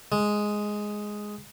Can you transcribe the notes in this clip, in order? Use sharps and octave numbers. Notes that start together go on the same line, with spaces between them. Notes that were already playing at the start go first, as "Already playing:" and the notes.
G#3